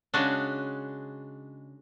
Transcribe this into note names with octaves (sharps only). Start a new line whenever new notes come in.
C#3 G#3 D4 F#4